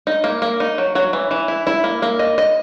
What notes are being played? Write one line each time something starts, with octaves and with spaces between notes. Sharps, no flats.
D#4
A#3
A#3
D#4
F#3
F#3
E3
E3
E4
E4
A#3
A#3
D#5
D#5